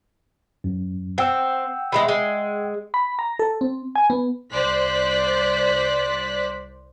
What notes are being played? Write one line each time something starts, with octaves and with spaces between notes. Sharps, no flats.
F#2
C4 F#5 G5 E6
E3 G3 G#3
G#3
B5
A#5
A4
C4
G#5
B3
C2 C5 D5 F#6 A6 B6